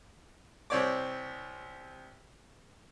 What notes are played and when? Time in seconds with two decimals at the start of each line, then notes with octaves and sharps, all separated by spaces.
0.70 C2 C4 C#5 D5 D6